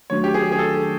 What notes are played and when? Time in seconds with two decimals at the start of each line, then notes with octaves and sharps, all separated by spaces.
0.10 D#3 F#3 A3 D4 F#4 C#5
0.24 G4
0.34 G#4
0.52 G#4
0.59 A4